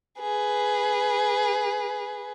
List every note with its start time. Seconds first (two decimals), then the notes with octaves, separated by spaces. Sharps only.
0.19 G#4 B4